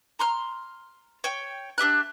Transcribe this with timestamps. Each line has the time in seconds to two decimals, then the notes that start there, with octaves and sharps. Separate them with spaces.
0.19 A#5 C6 F6
1.24 C#5 G5
1.78 D4 G4 E5 F#6